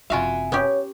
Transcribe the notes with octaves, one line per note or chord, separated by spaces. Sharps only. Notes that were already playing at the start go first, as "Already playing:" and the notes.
F#1 C3 F4 F#4 E5 F5 G#5
B3 C#4 G4 C#5